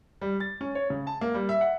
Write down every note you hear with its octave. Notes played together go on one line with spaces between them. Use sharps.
G3
A6
C#4
C#5
C#3
A5
A#3
G3
E5
F#5